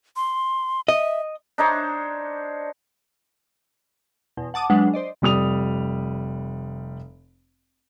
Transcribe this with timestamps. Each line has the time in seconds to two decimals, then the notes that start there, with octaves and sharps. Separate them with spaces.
0.16 C6
0.88 D#5 E5
1.58 D4 D#4 C5 C#5
4.37 E2 B2
4.54 F#5 A5 D6 D#6
4.70 F#3 G#3 D4 B4 F#5
4.94 C5 D5 D#5
5.22 F1 G3 D#6 F7